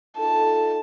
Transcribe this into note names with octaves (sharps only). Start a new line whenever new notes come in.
D#4 F4 A4 A5